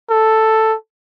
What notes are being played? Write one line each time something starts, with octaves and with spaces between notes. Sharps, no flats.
A4